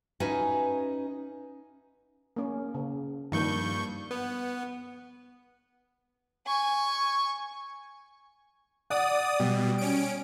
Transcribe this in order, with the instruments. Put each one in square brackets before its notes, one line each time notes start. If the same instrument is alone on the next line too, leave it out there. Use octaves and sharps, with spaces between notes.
[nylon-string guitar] C#4 D#4 F#4 B4 E5 G#5
[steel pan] A#3 C#4
C#3
[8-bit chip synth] G2 C#6 G6 [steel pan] D#3 F3 A#3
[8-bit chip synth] B3
[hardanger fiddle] G#5 C#6
[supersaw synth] D5 D#6 [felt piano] F#5
[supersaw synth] B2 [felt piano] G3
[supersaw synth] C#4 D7